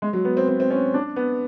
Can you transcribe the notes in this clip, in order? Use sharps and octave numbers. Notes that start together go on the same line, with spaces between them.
G#3
F#3
B3
C4
C4
C4
C#4
D4
B3